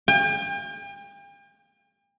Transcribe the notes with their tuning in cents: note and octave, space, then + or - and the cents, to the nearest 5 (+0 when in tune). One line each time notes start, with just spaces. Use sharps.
G5 +40